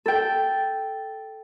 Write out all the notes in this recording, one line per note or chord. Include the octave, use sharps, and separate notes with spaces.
A4 G5